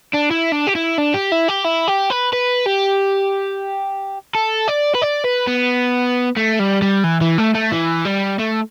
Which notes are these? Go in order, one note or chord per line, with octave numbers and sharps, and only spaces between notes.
D4
E4
D4
G4
E4
D4
G4
E4
G4
E4
G4
B4
B4
G4
A4
D5
B4
D5
B4
B3
A3
G3
G3
E3
E3
A3
A3
E3
G3
A3